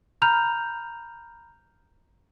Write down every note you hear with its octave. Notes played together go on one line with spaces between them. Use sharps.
A#5 B5 F6 G6 F7